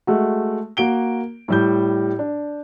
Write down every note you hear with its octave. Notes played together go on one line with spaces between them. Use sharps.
G#3 A3 F#4
A#3 F#4 D7 G7
A2 G3 G6
D4